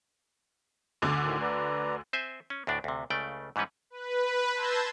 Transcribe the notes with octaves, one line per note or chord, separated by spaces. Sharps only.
D2 D3 D6
A2 D#3
B4 D5 A#5
C4 C5 E5 G#5
C#4
D2 A2 D4 D5
D2 C3
C#2 C#3 A3 D5 G5
G#2 E3 G3 C#4 B4
B4
A5 C6 E6 G6 G#6 A#6